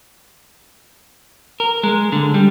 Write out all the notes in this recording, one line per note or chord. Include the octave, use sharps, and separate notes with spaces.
A#4
G#3
D3
G3